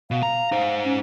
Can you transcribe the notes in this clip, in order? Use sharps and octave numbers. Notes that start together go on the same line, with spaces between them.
B2 F5
A#5
D#4 C5
C#4